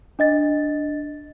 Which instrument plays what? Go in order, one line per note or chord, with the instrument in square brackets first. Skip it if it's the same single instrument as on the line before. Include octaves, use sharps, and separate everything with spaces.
[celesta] D4 D#5 A6